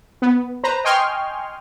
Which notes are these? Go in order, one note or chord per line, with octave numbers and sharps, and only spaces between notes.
B3
B4 C5 A#5
D#5 G5 G#5 C6 C#6 F6